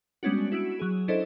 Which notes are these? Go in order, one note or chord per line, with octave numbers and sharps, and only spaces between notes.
G3 G#3 B3 C#4 D4 F#4
E4 F#4 E6 G#6 D7 E7
F#3 G#4
C#4 D4 E4 A4 C5 D#5